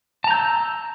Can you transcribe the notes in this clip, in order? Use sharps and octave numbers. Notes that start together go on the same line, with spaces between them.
A5 A#5 E6 G6